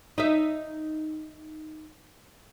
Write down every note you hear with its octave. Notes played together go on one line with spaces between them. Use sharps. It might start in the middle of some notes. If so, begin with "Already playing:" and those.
D#4 E5